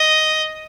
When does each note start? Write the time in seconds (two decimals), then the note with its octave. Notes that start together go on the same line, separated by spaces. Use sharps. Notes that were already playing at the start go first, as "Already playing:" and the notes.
Already playing: D#5